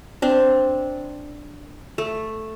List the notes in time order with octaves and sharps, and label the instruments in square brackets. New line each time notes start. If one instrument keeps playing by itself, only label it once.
[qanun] C4 D4
A3